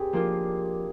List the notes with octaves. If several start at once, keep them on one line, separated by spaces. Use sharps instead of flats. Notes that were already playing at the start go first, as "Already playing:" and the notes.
Already playing: C4 G4 G#4 A#4
F3 A#3 D4 F4